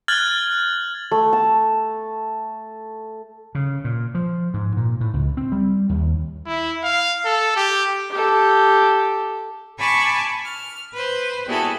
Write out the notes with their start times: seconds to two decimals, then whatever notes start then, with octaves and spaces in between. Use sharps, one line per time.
0.08 F6 F#6 G#6 A6 F#7
1.11 A3
1.33 A5
3.55 C#3
3.84 A#2
4.15 F3
4.54 G#2
4.77 A#2
5.01 A2
5.14 C#2
5.37 C4
5.52 G3
5.89 D#2
6.46 E4
6.84 F5
7.25 A4
7.56 G4
8.11 G4 A4
9.79 G#5 A5 B5 C#6 D6 G#6
10.44 F6
10.93 B4 C5
11.47 G3 B3 E4 F#4 G#4 A4